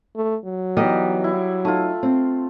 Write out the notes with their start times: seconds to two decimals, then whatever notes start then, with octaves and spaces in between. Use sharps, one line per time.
0.16 A3
0.45 F#3
0.77 E3 G3 B3 D#4 D#5
1.24 E4
1.65 A3 D#4 F4
2.03 C4